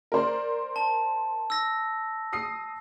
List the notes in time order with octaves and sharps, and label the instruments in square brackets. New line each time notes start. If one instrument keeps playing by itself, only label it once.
[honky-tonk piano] A#4 C5 D5
[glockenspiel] A5
E6 A#6
[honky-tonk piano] D#6 C7